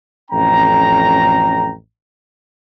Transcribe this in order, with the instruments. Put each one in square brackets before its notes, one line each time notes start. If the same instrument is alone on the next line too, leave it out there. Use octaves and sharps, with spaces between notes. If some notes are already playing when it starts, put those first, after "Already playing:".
[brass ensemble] A1 F2 C#4 G5 A#5